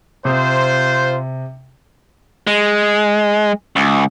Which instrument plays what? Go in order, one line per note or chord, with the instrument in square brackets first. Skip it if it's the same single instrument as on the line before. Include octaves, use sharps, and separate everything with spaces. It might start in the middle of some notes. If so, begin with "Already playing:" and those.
[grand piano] C3 D#6 [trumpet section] F4 C5
[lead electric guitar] G#3
C#2